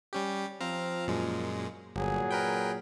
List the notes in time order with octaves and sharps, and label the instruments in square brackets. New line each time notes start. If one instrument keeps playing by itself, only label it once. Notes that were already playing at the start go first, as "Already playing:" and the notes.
[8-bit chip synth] G3 C#4 G4
[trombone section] F3 [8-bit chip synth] C4 F5 A#5
[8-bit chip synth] F#2 A#2 G#3
[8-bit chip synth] G1 [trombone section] A#2 F#3 G#4
[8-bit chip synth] A#4 B4 G5